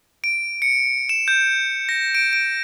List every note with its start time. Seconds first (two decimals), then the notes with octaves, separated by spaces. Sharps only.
0.24 D7
0.62 C#7
1.09 E7
1.28 G6
1.89 A#6
2.15 D7
2.33 D7